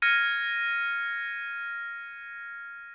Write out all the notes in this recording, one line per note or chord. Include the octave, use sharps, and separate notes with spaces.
F6 G#6 A#6 C#7 D#7